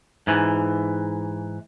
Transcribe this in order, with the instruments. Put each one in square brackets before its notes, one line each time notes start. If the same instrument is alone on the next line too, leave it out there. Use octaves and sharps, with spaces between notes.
[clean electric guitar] G#2 E3